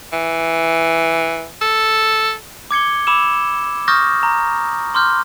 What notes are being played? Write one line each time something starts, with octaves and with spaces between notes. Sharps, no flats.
E3
A4
D6 G#6 C#7 G7
B5 D6 E6 E7
C#6 D#6 F6 G6 A6 A#6
A#5
C6 D6 F6 G6